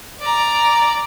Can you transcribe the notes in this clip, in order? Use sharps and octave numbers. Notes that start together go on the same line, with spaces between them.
D5 A#5